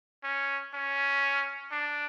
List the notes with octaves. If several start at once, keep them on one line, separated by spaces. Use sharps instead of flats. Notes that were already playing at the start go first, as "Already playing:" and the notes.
C#4
C#4
D4